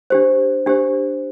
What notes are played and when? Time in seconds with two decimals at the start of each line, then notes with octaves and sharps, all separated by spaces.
0.10 D4 G4 C5
0.66 D4 G4 C5